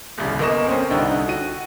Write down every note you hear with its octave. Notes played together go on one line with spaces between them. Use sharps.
D#1 C2 C#3
G1 A#3 D#5 C#6 E7
C4 C#4 C5
C2 D3 D#4 G5
F#4 D#7